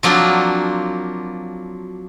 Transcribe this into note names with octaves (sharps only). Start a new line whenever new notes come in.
F3 F#3 A#3 C4 D4